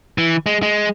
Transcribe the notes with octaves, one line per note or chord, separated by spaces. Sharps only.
E3
G#3
G#3